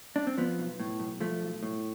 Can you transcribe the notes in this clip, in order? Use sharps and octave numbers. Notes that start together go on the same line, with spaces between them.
D4
C4
F3 B3
B1
A2
B1
F3 A3
B1
A2